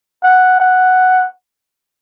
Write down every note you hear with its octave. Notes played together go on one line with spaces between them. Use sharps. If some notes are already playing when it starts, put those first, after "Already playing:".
F#5
F#5